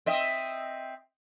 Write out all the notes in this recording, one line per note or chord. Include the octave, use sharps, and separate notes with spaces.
C4 D#5 E5